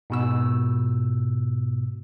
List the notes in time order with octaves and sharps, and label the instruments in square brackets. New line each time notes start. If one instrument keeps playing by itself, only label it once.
[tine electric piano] G#2 B2 E6